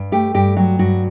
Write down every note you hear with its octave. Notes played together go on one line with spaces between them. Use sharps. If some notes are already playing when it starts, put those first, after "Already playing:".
Already playing: G2
A3 G4
G2 G4
F#3 F#4
G2 F#4